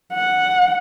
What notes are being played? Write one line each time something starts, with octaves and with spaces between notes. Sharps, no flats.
F#5